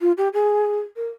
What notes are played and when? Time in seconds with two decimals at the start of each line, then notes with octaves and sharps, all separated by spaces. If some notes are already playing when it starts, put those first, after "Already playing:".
0.01 F4
0.17 G4
0.33 G#4
0.96 A#4